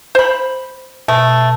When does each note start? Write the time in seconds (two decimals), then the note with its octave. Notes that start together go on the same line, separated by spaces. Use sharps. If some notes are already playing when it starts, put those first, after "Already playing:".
0.15 C5 B5
1.08 B2 A3